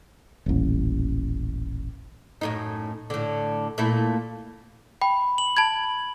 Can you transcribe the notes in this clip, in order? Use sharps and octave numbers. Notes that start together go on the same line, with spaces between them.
D#1 A1
F#2 A2 D#4
A2 D3
A#2 A3 E4
G5 B5
F#7
A5 B5 G#6